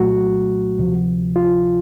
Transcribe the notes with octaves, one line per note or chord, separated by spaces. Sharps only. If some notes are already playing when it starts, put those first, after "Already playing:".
Already playing: C2 A#2 F#3 A3 F#4
D2 C3 F3
F4